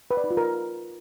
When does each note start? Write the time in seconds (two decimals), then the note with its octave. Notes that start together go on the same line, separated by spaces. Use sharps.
0.11 B4
0.17 D5
0.24 D#4
0.31 F4
0.37 A#4